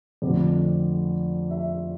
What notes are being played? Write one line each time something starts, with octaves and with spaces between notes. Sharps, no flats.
F2 D3 A3 C4 D5
E5